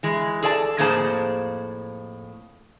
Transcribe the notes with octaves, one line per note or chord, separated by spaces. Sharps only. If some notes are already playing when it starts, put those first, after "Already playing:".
E3 G#3
G#4 A4 D5 G5 A5
F2 A2 A#3 G#4 C5 A5